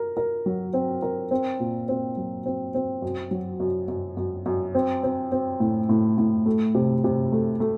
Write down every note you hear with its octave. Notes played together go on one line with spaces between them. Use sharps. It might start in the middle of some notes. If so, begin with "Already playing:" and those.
Already playing: A#4
A#4
F#3
C4
A#4
C4
A#2
C4
F#3
C4
C4
F#2
F#3
F#2
F#2
F#2
F#2
C4
C4
C4
A2
A2
A2
A3
C3
C3
A3
A3